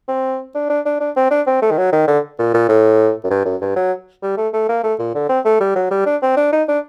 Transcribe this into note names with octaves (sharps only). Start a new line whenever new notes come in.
C4
D4
D4
D4
D4
C4
D4
C4
A3
D#3
F#3
D#3
D3
A#2
A#2
A2
F#2
G2
F#2
G2
F#3
G3
A3
A3
A#3
A3
A#2
D3
C4
A3
G3
F#3
G3
D4
C4
D4
D#4
D4